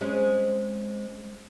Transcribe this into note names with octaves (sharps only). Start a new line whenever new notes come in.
G#3 C4 C#4